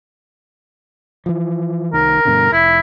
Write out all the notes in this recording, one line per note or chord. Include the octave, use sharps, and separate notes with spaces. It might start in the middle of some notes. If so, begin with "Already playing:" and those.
E3 F3
C2 D#3 A#4
G2 B2 D3
F1 E4